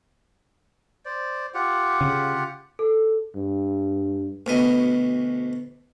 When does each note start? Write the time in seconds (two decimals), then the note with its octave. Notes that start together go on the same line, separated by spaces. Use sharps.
1.05 C5 D5
1.54 F4 G4 F#5
2.01 C#3
2.79 A4
3.36 G2
4.46 D2 B2 D#5